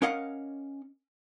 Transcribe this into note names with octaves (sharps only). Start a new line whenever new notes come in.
C#4 A#4 D#5 F5 F#5